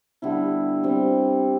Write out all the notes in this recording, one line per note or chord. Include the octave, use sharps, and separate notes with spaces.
D3 G3 B3 E4
G3 C4 G4